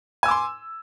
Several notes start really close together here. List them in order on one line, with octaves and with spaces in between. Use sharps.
G#5 E6 D6 C6